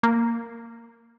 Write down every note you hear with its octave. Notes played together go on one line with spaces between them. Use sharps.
A#3